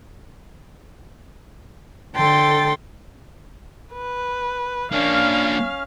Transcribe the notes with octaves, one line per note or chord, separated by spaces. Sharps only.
D3 A4 G5 C6 A6
B4
A#3 C#4 D4 F5 F6